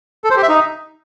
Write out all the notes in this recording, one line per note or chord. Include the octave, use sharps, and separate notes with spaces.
A4
C5
G4
E5
D#4